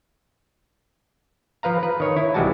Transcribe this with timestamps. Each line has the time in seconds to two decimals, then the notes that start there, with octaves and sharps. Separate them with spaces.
1.63 F3 B4 F5 A#5
1.83 B4
2.00 D#3 C#5
2.17 E4
2.34 C2 E3 G3 G#3 F#4 A5